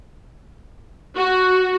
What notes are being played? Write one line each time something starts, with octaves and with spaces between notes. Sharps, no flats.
F#4